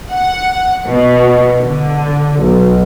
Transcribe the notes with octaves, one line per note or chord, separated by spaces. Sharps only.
F#5
B2
D3
B1